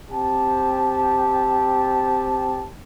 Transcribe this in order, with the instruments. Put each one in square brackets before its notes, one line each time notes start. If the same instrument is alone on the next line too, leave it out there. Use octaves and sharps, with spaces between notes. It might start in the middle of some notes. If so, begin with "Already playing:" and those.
[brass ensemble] C4 G4 A5